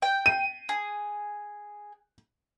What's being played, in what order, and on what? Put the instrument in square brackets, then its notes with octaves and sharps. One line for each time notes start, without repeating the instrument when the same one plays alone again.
[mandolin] G5
[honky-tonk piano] D#7
[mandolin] G#4